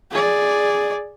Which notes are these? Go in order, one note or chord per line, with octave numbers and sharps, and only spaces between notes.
G#4 D5